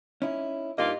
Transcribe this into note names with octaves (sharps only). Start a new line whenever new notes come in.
C#4 D#4 E4
G2 A#3 D#4 F4 G4 D#5